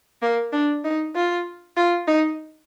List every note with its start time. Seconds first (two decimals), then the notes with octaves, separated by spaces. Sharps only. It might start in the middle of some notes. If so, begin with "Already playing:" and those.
0.22 A#3
0.53 D4
0.84 D#4
1.15 F4
1.77 F4
2.08 D#4